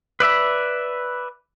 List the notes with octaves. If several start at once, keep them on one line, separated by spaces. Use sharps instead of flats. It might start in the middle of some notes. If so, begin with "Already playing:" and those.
B4 D5 E5 B5